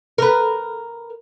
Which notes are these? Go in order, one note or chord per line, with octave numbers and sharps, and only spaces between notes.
A#4 B4